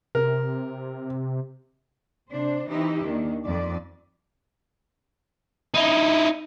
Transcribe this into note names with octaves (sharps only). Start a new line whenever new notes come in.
C3 A#4
C3 D4 C5
E3 C4 D#4 E4 G4
D#2 D#3 D4
F2 D5
D#4 E4